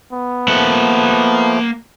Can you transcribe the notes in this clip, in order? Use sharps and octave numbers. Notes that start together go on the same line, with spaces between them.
B3
F3 A3 A#3 F#5